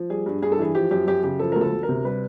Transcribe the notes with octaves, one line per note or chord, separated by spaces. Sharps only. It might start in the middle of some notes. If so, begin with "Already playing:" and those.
Already playing: F3
G3 G#4
G2
G2 G#4
A4
E3 G#4
F3 G4
F#2 G4
F#2 G4
C#3 G4
F3 A4
D2 A#4
A4
D2
A#4
C3
G3 B4